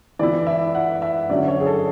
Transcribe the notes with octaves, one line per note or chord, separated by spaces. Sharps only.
E3 B3 E4 D5
E5
F#5
E5
D3 F#3 C#4 D5
C#5
G#4
A4